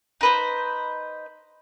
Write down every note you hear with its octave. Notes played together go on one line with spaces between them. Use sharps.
D#4 B4 C5